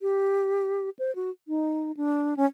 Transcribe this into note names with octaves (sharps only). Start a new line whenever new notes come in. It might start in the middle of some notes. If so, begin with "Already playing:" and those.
G4
C5
F#4
D#4
D4
C#4